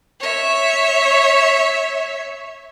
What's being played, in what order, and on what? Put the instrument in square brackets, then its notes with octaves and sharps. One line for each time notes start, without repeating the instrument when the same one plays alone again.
[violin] C#5 E5